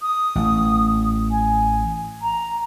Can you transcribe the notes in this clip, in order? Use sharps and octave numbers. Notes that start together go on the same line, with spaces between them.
D#6
A1
G#5
A#5